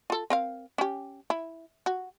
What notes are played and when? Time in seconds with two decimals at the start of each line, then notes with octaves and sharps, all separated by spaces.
0.10 F4 A4
0.30 C4 A#4 F5
0.78 C#4 G4
1.30 E4
1.86 F#4